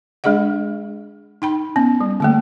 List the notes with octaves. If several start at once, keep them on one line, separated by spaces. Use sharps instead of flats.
G#3 D4 G#4 D#5 F#5
D#4 G5 B5
B3 C#4
G3
D3 A3 A#3